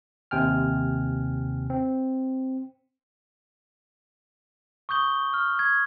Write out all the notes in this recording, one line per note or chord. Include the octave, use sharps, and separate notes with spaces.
D#2 C3 G5 G#5 F6
C4
C#6 D#6 G6 G7
F6
G#6